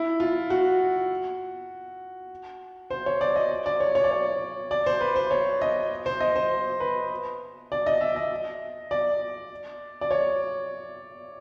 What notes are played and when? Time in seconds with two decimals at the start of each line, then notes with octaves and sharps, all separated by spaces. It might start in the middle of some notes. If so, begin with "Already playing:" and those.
Already playing: E4
0.20 F4
0.50 F#4
2.90 C5
3.06 C#5
3.21 D5
3.36 D#5
3.66 D5
3.80 C#5
3.95 C#5
4.04 D5
4.11 C#5
4.71 D5
4.86 C5
5.01 B4
5.16 C5
5.31 C#5
5.62 D#5
6.06 C5
6.21 D#5
6.36 C5
6.80 B4
7.72 D5
7.86 D#5
8.01 E5
8.16 D#5
8.91 D5
10.01 D5
10.11 C#5